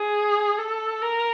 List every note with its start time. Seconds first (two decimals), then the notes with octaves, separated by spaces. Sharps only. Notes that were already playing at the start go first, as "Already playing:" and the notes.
Already playing: G#4
0.58 A4
1.02 A#4